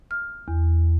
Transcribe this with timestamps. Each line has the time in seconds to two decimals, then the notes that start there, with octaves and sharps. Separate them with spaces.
0.11 F6
0.48 E2